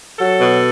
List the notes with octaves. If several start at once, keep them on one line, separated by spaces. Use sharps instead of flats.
F#3 A4
B2